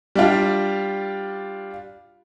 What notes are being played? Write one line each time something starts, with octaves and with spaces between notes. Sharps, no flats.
G3 D4 F4